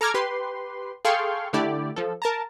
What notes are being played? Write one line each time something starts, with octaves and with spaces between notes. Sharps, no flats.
A4 A#5 D6 F6 G#6
G4 B4 C6
G#4 A4 F5 G5 C6 C#6
D3 A3 E4 G4 D5
F3 A4
A#4 A5 A#5